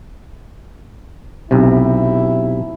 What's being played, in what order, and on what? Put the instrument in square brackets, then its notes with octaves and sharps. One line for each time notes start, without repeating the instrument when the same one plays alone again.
[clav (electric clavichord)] B1 C3 [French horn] E4